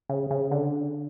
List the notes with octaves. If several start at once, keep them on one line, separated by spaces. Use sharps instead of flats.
C#3
C#3
D3